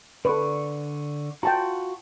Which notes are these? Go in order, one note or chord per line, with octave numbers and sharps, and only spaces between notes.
D3 A4 B4 D5 C#6
F4 F#4 G5 A5 A#5